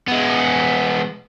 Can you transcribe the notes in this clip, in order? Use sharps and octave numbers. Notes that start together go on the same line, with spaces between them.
G#3 B3